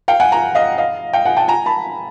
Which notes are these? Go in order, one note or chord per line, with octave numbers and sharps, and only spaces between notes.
F5 G5
F#5 G#5
G#5 A#5
D#5 F5
D#5 F5
F5 G5
F#5 G#5
G5 A5
G#5 A#5
A5 B5